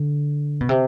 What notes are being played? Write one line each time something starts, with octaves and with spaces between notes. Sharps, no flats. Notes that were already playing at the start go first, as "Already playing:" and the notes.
Already playing: D3
B2
C3